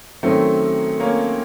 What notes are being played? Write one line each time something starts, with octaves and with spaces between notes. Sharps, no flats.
F#2 D#3 F#3 A3 C4
A#3 C#4